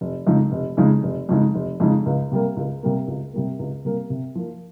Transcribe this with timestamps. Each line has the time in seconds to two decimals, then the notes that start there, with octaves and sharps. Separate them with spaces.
0.01 F1
0.27 F2 C#3 G#3 D#4
0.52 F1
0.77 F2 C#3 G#3 D#4
1.03 F1
1.29 F2 C#3 G#3 D#4
1.55 F1
1.80 F2 C#3 G#3 D#4
2.06 C#2
2.32 C3 G3 A#3
2.57 C#2
2.83 C3 G3 A#3
3.08 C#2
3.33 C3 G3 A#3
3.59 C#2
3.85 C3 G3 A#3
4.10 C3
4.35 F3 A#3